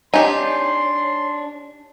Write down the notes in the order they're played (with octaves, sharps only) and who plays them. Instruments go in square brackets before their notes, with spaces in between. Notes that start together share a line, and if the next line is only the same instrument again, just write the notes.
[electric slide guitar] D4 C#5 [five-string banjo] D#4 G4 [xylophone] G#5 [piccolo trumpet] C6